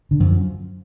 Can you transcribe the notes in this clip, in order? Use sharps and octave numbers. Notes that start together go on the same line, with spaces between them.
D3
F#2 F3